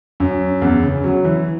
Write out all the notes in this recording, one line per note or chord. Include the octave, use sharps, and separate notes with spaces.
F#2
E2
C#3
F#3
E3